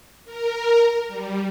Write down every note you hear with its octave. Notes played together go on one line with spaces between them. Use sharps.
A#4
G3